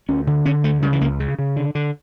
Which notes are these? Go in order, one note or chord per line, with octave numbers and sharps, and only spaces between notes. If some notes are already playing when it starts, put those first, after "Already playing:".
D2 C#4
D3
D3 C#4
D2 A3
C#3 G3
E3
C#2 A#3
C#3
C#3
D3
D3